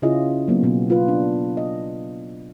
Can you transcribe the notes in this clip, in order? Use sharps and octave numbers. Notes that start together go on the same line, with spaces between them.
C#3 C#4 E4 F4 G#4 D#5
F#3 A#3 B3
B2 A#3 B3
D#4 F4 B4
D4
D#5